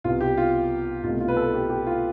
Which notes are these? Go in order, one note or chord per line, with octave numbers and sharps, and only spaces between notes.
C2 B2 B3 F4
G4
F4
C2 B2 A3 F4
F4
B4
A4
G4
G4
F4